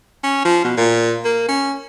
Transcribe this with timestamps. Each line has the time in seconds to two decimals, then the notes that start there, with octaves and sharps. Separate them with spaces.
0.23 C#4
0.45 F3
0.64 B2
0.77 A#2
1.25 A#3
1.48 C#4